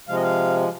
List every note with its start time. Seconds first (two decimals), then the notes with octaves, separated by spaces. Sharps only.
0.08 C3 F3 G#3 F5
0.15 D#5
0.23 F5